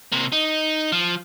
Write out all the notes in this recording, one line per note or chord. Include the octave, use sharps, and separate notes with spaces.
C3 A#3
D#4
F3